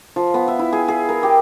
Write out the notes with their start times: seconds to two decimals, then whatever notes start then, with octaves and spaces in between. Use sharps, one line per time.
0.16 F3
0.34 B3
0.48 E5
0.59 E4
0.72 G#4
0.88 G#4
1.09 A#4
1.23 G4